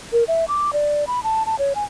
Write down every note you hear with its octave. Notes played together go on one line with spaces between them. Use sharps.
A#4
E5
D6
D5
B5
A5
A5
C#5
G#5